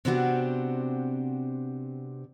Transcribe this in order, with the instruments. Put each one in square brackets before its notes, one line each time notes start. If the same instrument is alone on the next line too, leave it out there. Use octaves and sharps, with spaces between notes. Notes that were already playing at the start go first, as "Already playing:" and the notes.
[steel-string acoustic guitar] C3 B3 C4 D4 F#4 G4